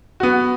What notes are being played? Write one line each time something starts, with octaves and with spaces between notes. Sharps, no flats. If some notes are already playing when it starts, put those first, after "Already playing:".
B3 F#4